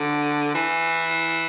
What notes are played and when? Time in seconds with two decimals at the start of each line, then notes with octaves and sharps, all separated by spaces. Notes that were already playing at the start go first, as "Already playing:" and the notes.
Already playing: D3
0.55 E3